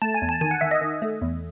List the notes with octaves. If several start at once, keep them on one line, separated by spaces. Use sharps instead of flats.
A3 A5
G#5
E2
A5
D#3 G#5
F#5
D#3 E5
D#5
D#3
A3
E2